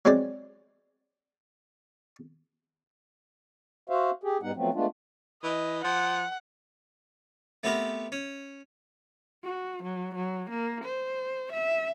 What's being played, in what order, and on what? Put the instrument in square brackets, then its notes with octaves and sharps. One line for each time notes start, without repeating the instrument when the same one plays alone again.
[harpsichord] F#3 G#3 C4 C5 D5
[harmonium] F#4 C5 E5 F5
G4 G#4
G#2 G3 B3 D#4 F#5
F3 F#3 A3 B3 C4
G#3 A3 B3 D4 F4
[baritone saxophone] E3 [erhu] D#5
[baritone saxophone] F3 [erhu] F#5
[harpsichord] A3 B3 C4 G4 A#4 B4
C#4
[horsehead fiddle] F#4
F#3
F#3
A#3
C5
E5